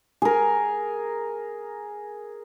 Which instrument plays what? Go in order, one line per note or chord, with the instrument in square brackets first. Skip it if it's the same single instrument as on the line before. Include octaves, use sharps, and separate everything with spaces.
[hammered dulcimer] G#4 A#4